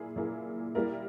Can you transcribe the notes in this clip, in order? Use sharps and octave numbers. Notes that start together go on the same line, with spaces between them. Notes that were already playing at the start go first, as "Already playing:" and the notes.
Already playing: A#2 A#3 E4 G#4
A#2 A#3 E4 G#4
G3 A#3 E4 A#4